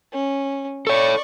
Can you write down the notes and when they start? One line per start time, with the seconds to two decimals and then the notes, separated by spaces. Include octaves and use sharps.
0.12 C#4
0.87 A4 C#5 D5 C#6